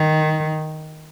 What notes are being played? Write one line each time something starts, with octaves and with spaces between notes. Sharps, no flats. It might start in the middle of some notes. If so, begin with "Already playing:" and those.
Already playing: D#3